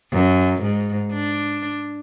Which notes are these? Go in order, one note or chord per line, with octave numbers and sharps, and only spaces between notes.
F#2
G#2
D4